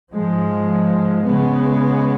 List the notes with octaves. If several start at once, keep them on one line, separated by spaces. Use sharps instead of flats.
G#2 F3 G#3
C#3 G#3 B3